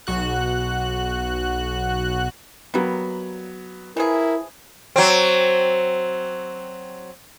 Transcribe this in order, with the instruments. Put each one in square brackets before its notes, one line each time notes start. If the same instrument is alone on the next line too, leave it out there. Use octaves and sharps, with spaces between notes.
[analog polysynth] B1 F#4 F#6
[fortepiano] F#3 B3 [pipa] G3 A#3
[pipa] E3 F3 G#4 [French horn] E4 [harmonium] A#4
[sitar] F#3 C4